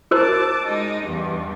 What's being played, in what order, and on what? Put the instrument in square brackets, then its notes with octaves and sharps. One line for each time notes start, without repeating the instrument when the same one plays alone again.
[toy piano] F#4 A#4 C5 [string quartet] A5 D6
[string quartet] G#3 D#4
E2 G2 E3